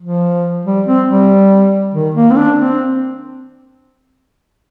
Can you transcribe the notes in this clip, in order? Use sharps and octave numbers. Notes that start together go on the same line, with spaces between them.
F3
G3
C4
G3
D#3
A#3
C4
D4
C4